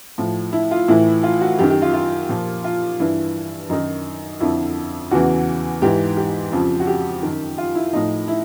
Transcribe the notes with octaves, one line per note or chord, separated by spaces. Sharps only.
A2 F3
E4
F4
A2 E3 E4
F4
F#4
F#2 D#3 G4
G4
F4
F4
A#2 F3
F4
G2 E3 E4
F#2 D#3 D#4
F2 D3 F3 E4
E2 C#3 E3 F#4
G#2 E3 G4
G4
F2 C#3 F3
F#4
G4
F#2 D#3
F4
E4
A2 F3 D#4
E4